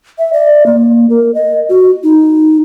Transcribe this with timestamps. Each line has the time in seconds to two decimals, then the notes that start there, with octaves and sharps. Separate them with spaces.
0.18 E5
0.33 D5
0.66 A#3
1.10 A#4
1.35 D#5
1.69 F#4
2.03 D#4